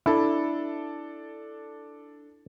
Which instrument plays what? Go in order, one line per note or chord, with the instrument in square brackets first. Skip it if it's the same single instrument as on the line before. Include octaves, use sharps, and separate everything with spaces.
[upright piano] D4 A4 [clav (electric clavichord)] E4